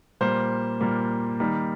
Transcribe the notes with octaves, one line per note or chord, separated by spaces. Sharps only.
A#2 G3 A#3 C5
A#2 G3 A#3
D#3 G3 A#3